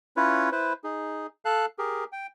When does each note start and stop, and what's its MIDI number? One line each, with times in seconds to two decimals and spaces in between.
0.17 0.50 61
0.17 0.50 64
0.17 0.50 65
0.17 0.50 71
0.17 0.50 73
0.52 0.73 64
0.52 0.73 71
0.52 0.73 72
0.84 1.27 63
0.84 1.27 68
1.45 1.66 69
1.45 1.66 77
1.45 1.66 81
1.45 1.66 90
1.79 2.04 67
1.79 2.04 68
1.79 2.04 70
2.12 2.27 79